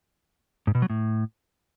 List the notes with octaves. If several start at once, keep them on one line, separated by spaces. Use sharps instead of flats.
G#2
B2
F#3
A2